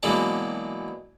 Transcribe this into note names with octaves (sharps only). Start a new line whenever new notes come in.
B2 E3 F#3 G#3 A#3 D4